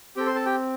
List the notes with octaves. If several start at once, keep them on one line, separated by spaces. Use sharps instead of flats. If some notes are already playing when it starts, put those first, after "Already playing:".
C4 G4 A4 G5
C5 C6
A4 A5
G4 G5